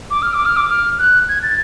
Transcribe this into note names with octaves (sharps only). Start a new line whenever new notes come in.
D6
F6
D6
F6
D6
F6
F#6
G#6
A6